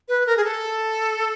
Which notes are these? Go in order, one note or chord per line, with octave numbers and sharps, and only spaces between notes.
B4
A#4
G#4
A4